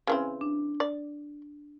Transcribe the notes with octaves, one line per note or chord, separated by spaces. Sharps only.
C#3 E3 C4
D4
D5